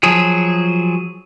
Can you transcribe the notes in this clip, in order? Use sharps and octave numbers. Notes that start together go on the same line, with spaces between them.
F3 F#3 G#4